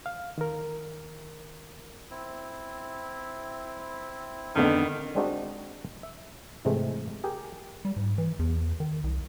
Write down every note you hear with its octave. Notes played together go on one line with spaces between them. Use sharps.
F5
D#3 A#4
C4 E4
F2 D3 D#3 B3
G3 G#3 C4 D4 D#4 F#4
E5
G#2 C3 E3 G#3 A3
G4 G#4 A#4
G3
G#2
E3
E2
D#3
C2